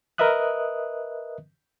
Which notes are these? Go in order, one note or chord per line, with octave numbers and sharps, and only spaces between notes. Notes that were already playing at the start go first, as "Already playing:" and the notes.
A#4 B4 D#5 E5 D#6 F#6